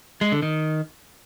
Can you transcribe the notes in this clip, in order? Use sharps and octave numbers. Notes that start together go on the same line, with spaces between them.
G#3
D3
D#3